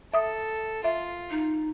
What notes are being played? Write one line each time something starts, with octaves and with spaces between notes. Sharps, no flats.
A4 E5 D#6
F4 E5
D#4